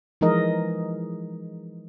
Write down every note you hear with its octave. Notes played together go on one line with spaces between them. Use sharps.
E3 F3 G#3 D#4 A#4 D#5